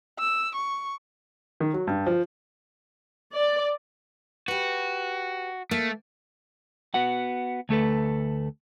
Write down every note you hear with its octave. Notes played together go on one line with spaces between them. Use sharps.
E6
C#6
D#3
F#3
G2
F3
D5
F#4 G4 B4
A3 A#3
B3 F#4 F#5
D2 A3 A4 B4